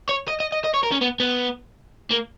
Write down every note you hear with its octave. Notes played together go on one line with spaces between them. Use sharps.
C#5
D#5
D#5
D#5
D#5
C#5
A#4
C#4
B3
B3
A#3